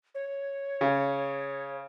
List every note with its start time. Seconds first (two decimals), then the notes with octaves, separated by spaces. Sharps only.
0.15 C#5
0.81 C#3